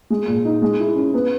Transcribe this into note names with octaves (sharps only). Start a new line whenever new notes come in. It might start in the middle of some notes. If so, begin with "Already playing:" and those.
G#3
A#2
D#4
G#3
E4
C#4
B3